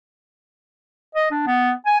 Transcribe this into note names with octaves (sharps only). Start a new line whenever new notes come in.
D#5
D4
B3
G#5